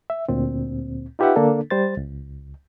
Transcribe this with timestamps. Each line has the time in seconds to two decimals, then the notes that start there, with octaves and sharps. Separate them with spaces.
0.10 E5
0.29 D2 A#2 C4
1.19 D#4 F4 G4 B4 E5 F#5
1.36 D3 A#3 D4 A4
1.70 G3 C5 A6
1.97 C#2